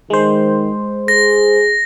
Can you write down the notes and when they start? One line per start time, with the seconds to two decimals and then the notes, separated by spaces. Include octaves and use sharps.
0.10 D#3 G#3 C5
1.08 G#4 A#6